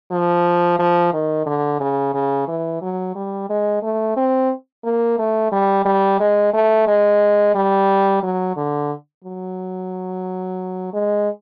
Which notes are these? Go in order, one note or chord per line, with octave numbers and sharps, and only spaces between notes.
F3
F3
D#3
D3
C#3
C#3
E3
F#3
G3
G#3
A3
C4
A#3
A3
G3
G3
G#3
A3
G#3
G3
F#3
D3
F#3
G#3